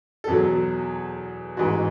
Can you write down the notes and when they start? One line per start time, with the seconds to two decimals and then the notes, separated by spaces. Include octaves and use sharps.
0.24 A4
0.28 E2 B2 F#3 G#4
1.57 A1 G#2 E3 F#4